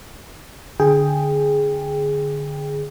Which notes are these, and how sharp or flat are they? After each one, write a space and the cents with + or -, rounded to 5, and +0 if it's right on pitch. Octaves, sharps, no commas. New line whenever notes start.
D3 +0 G#4 +0 G5 +10